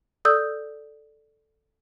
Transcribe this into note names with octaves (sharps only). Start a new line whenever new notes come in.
A4 D5 D#6 E6 G6